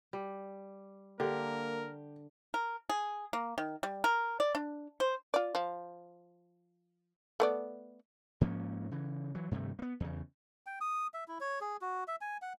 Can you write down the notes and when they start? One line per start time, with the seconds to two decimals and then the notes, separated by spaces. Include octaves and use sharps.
0.13 G3
1.20 D3 A#3 G4 A#4
2.54 A#4
2.89 G#4
3.33 A#3
3.58 D#3
3.83 G3
4.04 A#4
4.40 D5
4.55 D4
5.00 C5
5.34 F4 D5
5.55 F3
7.40 A3 B3 D5
8.41 G#2 F3 A#3 C#4
8.91 C#3 E3
9.35 E3 F#3
9.51 G2 C3 D#3 A3
9.79 A#3 B3
10.00 E2 C#3
10.66 G5
10.81 D#6
11.14 E5
11.28 E4
11.40 C#5
11.61 G#4
11.81 F#4
12.08 E5
12.21 G#5
12.42 F#5